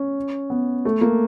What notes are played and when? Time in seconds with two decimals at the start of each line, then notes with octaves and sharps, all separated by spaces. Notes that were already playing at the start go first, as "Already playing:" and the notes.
Already playing: C#4
0.50 B3
0.85 A3
1.01 A#3